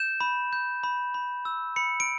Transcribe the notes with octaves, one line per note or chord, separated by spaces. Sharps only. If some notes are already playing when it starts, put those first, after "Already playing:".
Already playing: G6 E7
B5
G6
B5
B5
E6
B5 C#7
D7